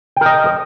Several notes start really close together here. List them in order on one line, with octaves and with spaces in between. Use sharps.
G5 A#4 D#5